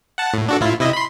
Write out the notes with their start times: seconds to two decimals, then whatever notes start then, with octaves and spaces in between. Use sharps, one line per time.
0.18 F#5 A5
0.34 A2
0.49 D4 F#4 A4
0.61 A2 E4 F4
0.80 C3 E4 D#5
0.93 B5 C6